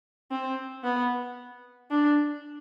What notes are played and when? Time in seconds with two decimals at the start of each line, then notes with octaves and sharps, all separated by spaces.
0.31 C4
0.84 B3
1.91 D4